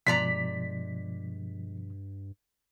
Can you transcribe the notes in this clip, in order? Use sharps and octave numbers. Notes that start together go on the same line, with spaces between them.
G2 B2 F3 G#3 D5 A#5 B6